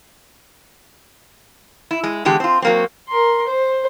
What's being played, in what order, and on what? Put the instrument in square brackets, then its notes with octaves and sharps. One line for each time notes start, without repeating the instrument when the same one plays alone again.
[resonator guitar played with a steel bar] E4
G#3
E2 D3 G#3 G4
C4 F4
F#3 A#3 C4
[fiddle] A#4 C6
C5